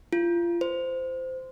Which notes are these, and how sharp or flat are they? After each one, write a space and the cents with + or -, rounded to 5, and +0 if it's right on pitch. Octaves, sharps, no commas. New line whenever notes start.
F4 -25
C5 -15